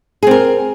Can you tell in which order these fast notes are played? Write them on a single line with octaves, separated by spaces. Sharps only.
G#4 C4 A#4